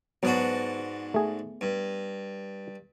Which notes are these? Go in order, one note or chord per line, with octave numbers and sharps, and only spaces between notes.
G#2 F#3 B3 D4 F#4
A3 G#4
G2